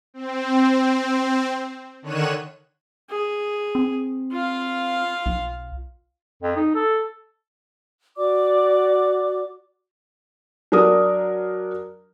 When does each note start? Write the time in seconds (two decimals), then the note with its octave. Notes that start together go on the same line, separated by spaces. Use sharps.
0.14 C4
2.02 D3 D#3 C#5 F#6 D#7 E7
3.10 G#4
3.75 C4
4.32 F4 F5
5.26 B1
6.43 F2
6.56 D#4
6.75 A4
8.16 F#4 D5 D6
10.72 F#3 D4 A#4 D#6